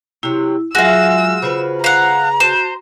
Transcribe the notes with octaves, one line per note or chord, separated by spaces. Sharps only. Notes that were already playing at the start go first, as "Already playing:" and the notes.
C3 F#3 E4
F#3 G#3 F4 F#4 E5 F5 G#5 E6
C#3 F4 B4 C5
F5 F#5 A#5
F#4 C5